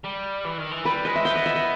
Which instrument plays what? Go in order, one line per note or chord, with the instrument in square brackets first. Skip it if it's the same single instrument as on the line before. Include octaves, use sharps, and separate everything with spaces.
[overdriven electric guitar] G3
E3
D#3
E3
[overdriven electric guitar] G3 [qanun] B4
[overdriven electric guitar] G#3 [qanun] D#5
[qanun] E5
[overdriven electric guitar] B3 [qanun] G5
[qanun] D#5
E5
D#5